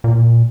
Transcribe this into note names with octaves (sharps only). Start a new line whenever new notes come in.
A#2